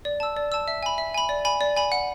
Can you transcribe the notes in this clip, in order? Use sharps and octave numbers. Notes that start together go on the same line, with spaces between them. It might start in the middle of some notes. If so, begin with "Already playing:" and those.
D5
A5 E6
D5
A5 E6
E5
G#5 B5
E5
G#5 B5
D5
G#5 B5
D5
G#5 B5
F#5